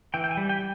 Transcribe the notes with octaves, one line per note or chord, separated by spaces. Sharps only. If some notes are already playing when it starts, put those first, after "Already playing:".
E3 G5
G5
G#5
G3
G5